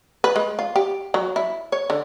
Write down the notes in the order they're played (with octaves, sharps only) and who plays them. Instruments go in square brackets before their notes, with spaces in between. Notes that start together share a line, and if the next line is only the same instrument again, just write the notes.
[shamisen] B4
G#3
F4
G4
F#3
E4
C#5
D3